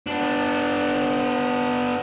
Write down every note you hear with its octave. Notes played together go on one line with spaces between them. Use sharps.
B3 D4